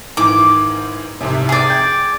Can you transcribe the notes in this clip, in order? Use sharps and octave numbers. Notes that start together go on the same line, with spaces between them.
G#2 D#3 E3 D6
C2 G#2 C3
G#4 D5
G5 G6 G#6